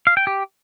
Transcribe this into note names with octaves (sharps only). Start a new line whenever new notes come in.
F5
G5
G4